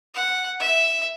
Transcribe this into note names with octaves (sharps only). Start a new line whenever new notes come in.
F#5
E5